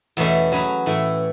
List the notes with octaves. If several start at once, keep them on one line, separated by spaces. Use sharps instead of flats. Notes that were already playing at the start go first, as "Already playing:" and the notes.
E2 B2 A3 C#4
F#3 C#4 G#4 B4
A2 E3 A3